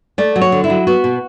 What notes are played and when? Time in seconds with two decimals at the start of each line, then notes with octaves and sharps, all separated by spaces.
0.18 A3 D5
0.36 F#3
0.41 C#5
0.52 D3
0.64 E4
0.70 F#3
0.87 B3 F#4
1.04 B2